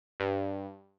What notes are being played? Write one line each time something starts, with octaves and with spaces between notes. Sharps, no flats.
G2